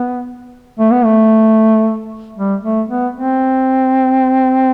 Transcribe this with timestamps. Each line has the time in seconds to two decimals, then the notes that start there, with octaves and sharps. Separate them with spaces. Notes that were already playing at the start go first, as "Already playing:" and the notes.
Already playing: B3
0.79 A3
0.91 B3
1.04 A3
2.37 G3
2.63 A3
2.89 B3
3.15 C4